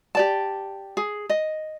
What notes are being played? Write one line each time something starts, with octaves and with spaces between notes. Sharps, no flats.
G4 D5 A5
G#4
D#5